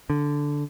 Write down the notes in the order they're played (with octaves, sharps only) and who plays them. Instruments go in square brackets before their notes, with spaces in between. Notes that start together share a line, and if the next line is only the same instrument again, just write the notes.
[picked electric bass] D3